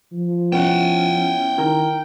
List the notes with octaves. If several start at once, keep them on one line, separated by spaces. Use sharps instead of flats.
F3
B3 C#4 E4 F#5 G5
D#3 E4 A#4 A#5